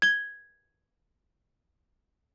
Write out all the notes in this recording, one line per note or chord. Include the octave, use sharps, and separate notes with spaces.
G#6 G7